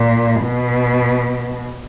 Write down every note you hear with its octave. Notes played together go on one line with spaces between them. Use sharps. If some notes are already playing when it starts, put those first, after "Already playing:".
Already playing: A#2
B2